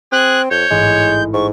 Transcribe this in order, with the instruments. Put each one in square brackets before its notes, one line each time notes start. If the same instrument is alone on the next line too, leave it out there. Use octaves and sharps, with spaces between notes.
[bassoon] C4 [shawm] G#4 [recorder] F#6
[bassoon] F2 [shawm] C#5 [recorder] G6
[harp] A1 G#2 [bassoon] G#3
[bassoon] G#2 [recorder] C#6